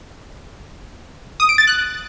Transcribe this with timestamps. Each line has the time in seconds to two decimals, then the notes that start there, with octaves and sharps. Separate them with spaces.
1.40 D#6
1.49 D7
1.58 A6
1.67 F#6